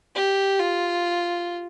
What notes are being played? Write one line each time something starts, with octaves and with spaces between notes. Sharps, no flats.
G4
F4